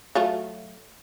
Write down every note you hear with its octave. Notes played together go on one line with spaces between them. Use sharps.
F#3 A3 F4